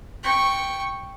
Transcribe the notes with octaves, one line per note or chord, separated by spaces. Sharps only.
G5 C#6